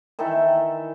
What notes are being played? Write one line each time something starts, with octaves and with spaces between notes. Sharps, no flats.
D#3 E3 A4 E5